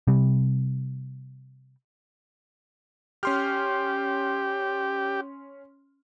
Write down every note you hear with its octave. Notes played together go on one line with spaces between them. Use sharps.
C3 G3
C#4 G4 C6 F6